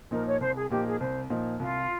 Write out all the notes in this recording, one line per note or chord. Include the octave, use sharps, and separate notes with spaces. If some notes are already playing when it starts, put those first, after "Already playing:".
A#2 F3 A#3 D#4 A#4
C#5
C2 C5
G#4
A#2 F3 A#3 D#4 G4
G#4
C2 C5
A#2 F3 A#3 D#4
C2 F4